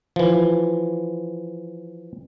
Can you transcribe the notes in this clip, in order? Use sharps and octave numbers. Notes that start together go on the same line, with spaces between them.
E3 F3